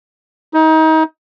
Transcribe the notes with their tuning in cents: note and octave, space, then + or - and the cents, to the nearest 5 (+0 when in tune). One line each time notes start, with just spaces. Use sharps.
D#4 +30